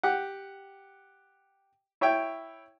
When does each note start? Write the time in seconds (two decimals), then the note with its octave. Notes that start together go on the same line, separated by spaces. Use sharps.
0.03 G4 F#5
2.01 E4 C#5 E5 G5